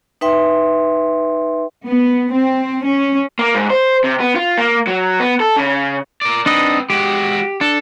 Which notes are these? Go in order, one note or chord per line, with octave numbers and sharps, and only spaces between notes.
D#4 B4 E5 G5 C6
B3
C4
C#4
A#3
G#2
C5
C3
B3
F4
A#3
F#3
B3
A4
C#3
A#4 D5
C4 D4 D#4 B4 D#5
G#3 F#4 G4
D4 A4